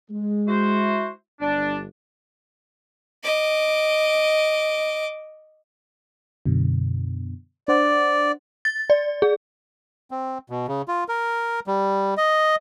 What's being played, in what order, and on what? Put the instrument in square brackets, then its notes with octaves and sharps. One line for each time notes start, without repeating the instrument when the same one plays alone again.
[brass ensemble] G#3
[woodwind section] E4 F#4 C5
[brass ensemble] G1 [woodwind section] D4
[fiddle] D#5 D6
[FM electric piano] F#2 B2 D3
[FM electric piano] D4 C5 F#5 [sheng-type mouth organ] D5
[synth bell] A6
D5
G#4
[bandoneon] C4
B2
C#3
F4
A#4
G3
D#5